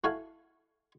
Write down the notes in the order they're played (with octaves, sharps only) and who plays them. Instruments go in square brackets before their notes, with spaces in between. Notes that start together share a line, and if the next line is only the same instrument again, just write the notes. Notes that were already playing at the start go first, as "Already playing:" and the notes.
[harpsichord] A3 E4 F#4 F5 G#5